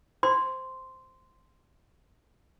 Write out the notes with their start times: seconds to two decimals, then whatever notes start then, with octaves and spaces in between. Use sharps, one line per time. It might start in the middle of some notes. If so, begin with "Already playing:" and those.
0.23 C5 C6